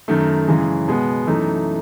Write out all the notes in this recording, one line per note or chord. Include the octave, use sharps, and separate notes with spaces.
F#2 D#3 A3
F#2 C#3 E3 G#3
B2 G#3 B3
F#2 E3 A3 D#4